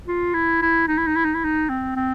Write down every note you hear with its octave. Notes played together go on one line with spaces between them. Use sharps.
F4
E4
E4
D#4
E4
D#4
E4
D#4
E4
D#4
C4
C4